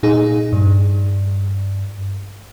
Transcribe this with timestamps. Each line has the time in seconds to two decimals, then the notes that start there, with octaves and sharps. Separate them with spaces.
0.03 A#2 D#4 G#4
0.52 G2